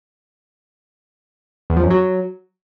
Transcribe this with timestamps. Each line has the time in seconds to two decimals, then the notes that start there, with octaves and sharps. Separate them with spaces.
1.70 E2
1.77 F3
1.84 F#2
1.90 F#3